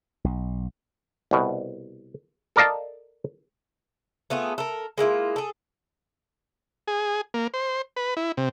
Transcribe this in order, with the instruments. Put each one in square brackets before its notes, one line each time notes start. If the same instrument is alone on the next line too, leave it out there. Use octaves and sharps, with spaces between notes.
[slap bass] B1
[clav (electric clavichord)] C2 B2
A4 A#4 D5 D#5 F5 A5
[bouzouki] A3 B3 F4 G#4
A4 A#4
G#3 A#3 E4 F4
G#4 A4
[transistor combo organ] G#4
A#3
C5
B4
E4
C3